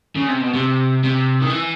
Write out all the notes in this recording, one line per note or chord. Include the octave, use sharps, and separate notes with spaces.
C#3
C3
B2
C3
C3
D#3
E3